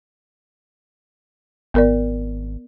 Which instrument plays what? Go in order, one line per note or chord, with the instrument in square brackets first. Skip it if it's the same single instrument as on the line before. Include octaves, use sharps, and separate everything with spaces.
[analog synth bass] G#1 [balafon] B3 A#4 D5